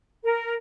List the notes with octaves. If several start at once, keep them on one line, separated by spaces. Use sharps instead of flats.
A#4